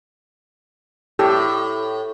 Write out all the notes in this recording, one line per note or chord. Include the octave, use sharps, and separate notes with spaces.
A2 G4 A4